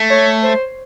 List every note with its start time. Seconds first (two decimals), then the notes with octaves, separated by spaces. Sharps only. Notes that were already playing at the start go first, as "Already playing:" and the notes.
Already playing: A3
0.10 C#5
0.43 C5